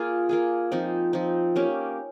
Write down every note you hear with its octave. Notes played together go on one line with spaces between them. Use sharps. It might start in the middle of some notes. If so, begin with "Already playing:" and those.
Already playing: A#3 F4 G#4
A#3 F4 G#4
F3 C4 D#4
F3 C4 D#4
A#3 C#4 G4